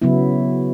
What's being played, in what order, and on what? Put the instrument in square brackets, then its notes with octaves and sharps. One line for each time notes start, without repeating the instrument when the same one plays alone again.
[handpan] C#3 F#3 B3 E4